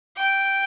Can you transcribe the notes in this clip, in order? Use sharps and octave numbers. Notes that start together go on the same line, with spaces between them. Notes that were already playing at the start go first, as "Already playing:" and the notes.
G5